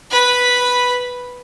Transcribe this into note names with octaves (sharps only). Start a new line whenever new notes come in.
B4 B5